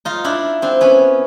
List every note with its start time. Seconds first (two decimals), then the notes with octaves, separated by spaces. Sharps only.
0.05 D#4 F4
0.24 D4 E4
0.62 C4 D4
0.81 B3 C#4